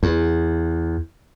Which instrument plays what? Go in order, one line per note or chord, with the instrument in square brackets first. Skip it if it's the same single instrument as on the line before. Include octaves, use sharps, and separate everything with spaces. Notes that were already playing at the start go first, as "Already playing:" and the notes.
[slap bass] E2